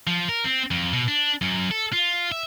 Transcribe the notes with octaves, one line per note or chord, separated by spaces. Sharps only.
F3
A#4
C4
F2
B2
D4
F#2
A4
F4
E5